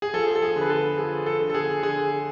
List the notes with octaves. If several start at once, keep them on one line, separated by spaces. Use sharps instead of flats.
G#4
F3 A4
A4
G#4
D3
B4
A4
F3 G#4
A4
D3
A4
G#4
D3 G#4